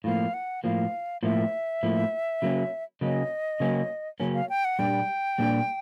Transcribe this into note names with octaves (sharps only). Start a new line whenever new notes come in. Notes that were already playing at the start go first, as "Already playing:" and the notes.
A2 F3 A#3 F5
F#5
A2 F3 A#3 F5
A2 F3 A#3 E5
A2 F3 A#3
C#3 F#3 A#3 C#4
C#3 F#3 A#3 C#4 D#5
C#3 F#3 A#3 C#4
C#3 F#3 A#3 C#4
F5
G5
F#5
A#2 G3 A#3 D4 G4 G5
A#2 G3 A#3 D4 G4